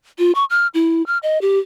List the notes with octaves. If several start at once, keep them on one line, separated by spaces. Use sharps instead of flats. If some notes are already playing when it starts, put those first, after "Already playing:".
F4
C#6
F6
E4
F6
D#5
G4